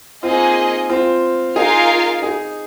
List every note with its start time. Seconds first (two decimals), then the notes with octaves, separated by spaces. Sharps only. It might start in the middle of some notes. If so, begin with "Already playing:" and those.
0.23 A#3 C4 D#4 F4 G#4 D#5
0.90 C4 F4
1.56 D#4 F4 G#4 A#4 F5 G#5
2.22 D#4 G#4